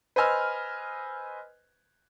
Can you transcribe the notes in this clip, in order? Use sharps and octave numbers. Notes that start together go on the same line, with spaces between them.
B4 C5 D#5 G#5 E6 F6